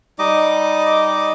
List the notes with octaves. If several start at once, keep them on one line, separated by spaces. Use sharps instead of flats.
G3 D#4 D#5 D6